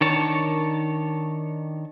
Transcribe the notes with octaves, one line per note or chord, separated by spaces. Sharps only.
D#3 D4 C#5 A5